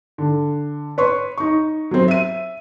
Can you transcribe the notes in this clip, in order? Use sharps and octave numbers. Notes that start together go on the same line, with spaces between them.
D3
B4 C#5 C6 C#6
D#4 C#6
F#3 C4
E5 D#7